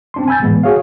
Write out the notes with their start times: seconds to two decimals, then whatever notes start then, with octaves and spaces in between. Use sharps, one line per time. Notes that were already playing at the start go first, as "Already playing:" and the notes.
0.14 C4 D4 C6
0.28 G#5 B5 E6 G6 A6
0.41 A2 E3 G#3 B3
0.63 F#4 G#4 C#5 F5